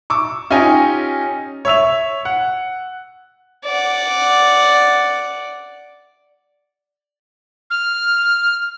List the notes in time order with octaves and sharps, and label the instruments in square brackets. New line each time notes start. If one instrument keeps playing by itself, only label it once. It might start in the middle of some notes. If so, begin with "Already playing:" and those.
[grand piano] C#6 D6 E6
C#4 D#4 F4 G4 D#5 G#5
C#5 E5 E6 F7
F#5
[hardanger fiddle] D5 F#5
[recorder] F6